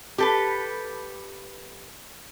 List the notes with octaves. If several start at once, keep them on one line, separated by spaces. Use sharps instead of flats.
G4 A4 B4